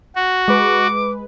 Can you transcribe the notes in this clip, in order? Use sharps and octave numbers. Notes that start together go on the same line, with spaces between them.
F#4
G#3 B4 D6